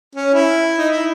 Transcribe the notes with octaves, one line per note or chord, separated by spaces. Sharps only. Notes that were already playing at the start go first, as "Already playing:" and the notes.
C#4
E4
D#4
E4